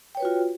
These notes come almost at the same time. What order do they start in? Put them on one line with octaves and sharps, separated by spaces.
G5 C#5 B4 F#4 F4